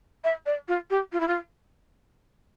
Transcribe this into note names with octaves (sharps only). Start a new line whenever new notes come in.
E5
D5
F4
G4
F4
E4
F4